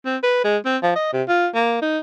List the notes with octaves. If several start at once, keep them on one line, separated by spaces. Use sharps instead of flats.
C4
B4
G#3
C4
F3
D#5
C3
F4
A#3
D#4